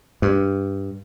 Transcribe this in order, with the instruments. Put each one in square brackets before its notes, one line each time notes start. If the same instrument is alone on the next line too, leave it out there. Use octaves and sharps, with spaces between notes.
[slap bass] G2